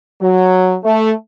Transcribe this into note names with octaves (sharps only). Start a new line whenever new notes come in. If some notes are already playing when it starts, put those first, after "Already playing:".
F#3
A3